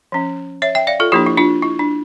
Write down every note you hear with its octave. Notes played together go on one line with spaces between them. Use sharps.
F3 C#4
C#5 E5
E5 G5
D5 F5
F4 A4
F3 A#3 D4 E4 G4
E4
D4 F4
E4
D4